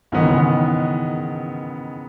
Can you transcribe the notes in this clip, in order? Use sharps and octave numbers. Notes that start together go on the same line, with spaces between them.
G#2 D#3 E3 B3
C#3
D#3